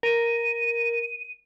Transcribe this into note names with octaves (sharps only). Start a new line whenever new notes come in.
A#4 D#7